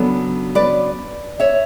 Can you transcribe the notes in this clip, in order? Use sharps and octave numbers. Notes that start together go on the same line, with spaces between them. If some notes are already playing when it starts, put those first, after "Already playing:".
Already playing: C#3 F#3 B3 D4 A4
B4 D5
C#5 E5